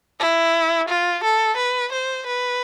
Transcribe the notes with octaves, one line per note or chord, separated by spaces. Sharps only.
E4
F4
A4
B4
C5
B4